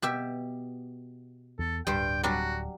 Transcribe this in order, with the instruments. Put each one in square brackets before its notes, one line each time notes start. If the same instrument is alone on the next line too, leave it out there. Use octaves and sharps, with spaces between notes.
[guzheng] B2 G4 E5
[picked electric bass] E2 [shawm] A4
[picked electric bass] D1 [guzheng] G2 G3 C5 [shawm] G5
[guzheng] F#3 G3 D4 [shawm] F#4